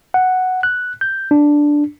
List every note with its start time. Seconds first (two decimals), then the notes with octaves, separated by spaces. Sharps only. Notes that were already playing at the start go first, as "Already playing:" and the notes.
0.14 F#5
0.63 F#6
1.01 G6
1.31 D4